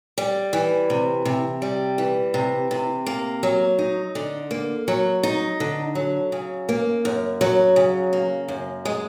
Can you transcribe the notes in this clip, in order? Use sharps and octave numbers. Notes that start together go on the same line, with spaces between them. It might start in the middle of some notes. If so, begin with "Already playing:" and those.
G3
E3
C3
C3
G3
E3
C3
C3
A#3
F#3
D#4
D3
A#3
F#3
D#4
D3
F#3
C#3
A#3
F#2
F#3
C#3
A#3
F#2
G#3